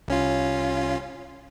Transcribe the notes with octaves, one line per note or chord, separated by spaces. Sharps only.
C2 C#4 F4